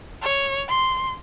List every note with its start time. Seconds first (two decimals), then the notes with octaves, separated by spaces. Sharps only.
0.22 C#5
0.68 C6